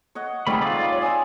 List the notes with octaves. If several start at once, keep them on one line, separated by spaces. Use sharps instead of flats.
C#5 D#5 F#5
G3 A3 C4 D#4 G#4 B5
F4 D5 F5
C#5
G#5 D#6 E6